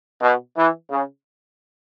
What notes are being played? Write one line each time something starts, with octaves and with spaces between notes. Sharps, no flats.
B2
E3
C#3